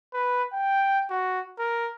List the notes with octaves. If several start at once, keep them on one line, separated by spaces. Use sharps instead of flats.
B4
G5
F#4
A#4